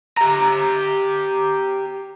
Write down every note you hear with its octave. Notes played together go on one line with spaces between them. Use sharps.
G4 A#5